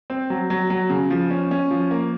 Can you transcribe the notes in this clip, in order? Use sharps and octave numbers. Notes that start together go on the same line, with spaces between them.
C4
F#3
F#3
F#3
C#3
F3
C#4
C#4
F3
A#3